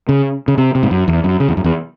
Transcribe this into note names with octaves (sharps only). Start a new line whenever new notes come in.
C#3
C#3
C3
C3
G#2
F#2
E2
F#2
C#3
E2
F#2
E2